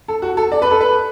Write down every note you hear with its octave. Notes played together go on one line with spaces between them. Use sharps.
A4
F#4
A4
D5
B4
A4
B4